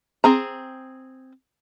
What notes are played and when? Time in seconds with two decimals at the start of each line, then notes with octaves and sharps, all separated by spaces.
0.24 C4 G#4 A#5